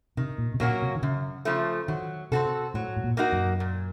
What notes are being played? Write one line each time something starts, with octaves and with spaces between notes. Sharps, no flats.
C3 D#3
A#2
C3
A#2 F#3 A#3 C#4 F#4
C3
D#3
F#2 C#3
C#3 F3 A3
D#3 F#3
C3 C4 F#4 A4
A2 F#3
A2
A#2
A#3 D#4 F#4 A#4
F#2
A#2